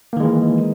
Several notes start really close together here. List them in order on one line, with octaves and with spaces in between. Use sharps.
A#3 D#3 G#3 E3